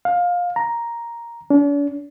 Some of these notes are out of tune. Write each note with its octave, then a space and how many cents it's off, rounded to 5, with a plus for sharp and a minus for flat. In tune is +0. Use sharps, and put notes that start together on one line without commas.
F5 +20
A#5 +5
D4 -45